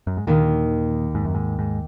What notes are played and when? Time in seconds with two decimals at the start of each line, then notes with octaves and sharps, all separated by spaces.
0.07 F#2
0.17 G#2
0.27 D#2 A#2 D#3 A#3
1.15 G#2
1.25 F#2
1.35 G#2
1.59 G#2